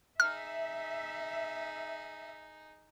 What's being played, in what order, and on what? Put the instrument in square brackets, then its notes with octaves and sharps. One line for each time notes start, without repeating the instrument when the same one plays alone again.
[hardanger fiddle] D#4 G#4 [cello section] E5 [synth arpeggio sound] F6